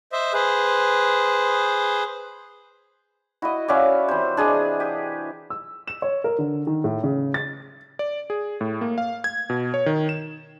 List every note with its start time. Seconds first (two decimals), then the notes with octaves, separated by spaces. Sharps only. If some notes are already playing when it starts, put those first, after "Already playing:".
0.12 C5 D#5 E5
0.33 G#4 B4 C5
3.42 E4 F#4 D#5
3.68 C#4 F#4 C#5 D5 E5 F5
4.08 C3 E3 C5
4.37 D4 G4 G#4 D#5
4.80 G4
5.50 E6
5.88 E7
6.02 C#5
6.24 A#4
6.38 D3
6.67 D#3
6.84 A2
7.04 C#3
7.34 A6
7.99 D5
8.30 G#4
8.61 A2
8.81 A#3
8.98 F5
9.24 G#6
9.50 B2
9.74 C#5
9.86 D#3
10.09 E7